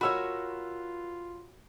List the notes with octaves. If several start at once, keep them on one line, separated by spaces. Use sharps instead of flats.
F4 F#4 A#4 C#5 B5 E6